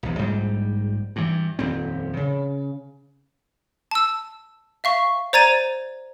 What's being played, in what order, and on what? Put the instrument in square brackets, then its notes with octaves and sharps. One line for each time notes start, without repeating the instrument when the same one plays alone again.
[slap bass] B1 E2
A#1 G#2 G3
G2 E3
D#1 F2 C4
C#3
[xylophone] A5 E6
E5 F5 C#6
C5 D5 A#5 G#6 A6 D#7